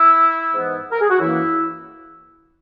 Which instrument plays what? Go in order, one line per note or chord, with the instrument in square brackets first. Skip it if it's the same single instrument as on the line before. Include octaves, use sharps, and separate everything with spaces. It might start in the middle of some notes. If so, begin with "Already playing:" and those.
Already playing: [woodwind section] E4
G#2 E3 B3
A#4
G#4
F#4
F#2 E3 A#3 E4